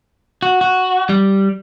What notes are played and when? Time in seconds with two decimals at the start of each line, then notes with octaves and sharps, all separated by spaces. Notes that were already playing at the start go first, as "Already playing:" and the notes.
0.42 F#4
0.61 F#4
1.09 G3